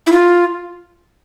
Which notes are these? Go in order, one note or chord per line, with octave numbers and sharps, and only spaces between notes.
E4
F4